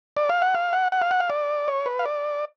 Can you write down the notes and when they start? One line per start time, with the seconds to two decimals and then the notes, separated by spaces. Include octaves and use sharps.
0.17 D5
0.29 F5
0.42 F#5
0.55 F5
0.73 F#5
0.92 F#5
1.02 F5
1.11 F#5
1.20 F5
1.30 D5
1.68 C#5
1.86 B4
1.99 F5
2.05 D5